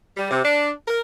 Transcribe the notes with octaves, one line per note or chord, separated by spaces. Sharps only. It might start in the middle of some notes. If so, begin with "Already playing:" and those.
G3
C3
D4
A#4